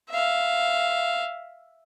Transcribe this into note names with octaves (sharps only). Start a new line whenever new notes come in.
E5 F5